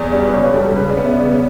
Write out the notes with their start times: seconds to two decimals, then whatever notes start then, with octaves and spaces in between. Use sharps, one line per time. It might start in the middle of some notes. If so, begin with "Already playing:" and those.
Already playing: E2 D5
0.12 G3 D5
0.26 B4
0.33 C#2 C#5
0.43 B4
0.54 G3 A4
0.66 A4
0.75 C#3 B4
0.90 D5
0.97 B3
1.04 E5
1.19 C#3 D5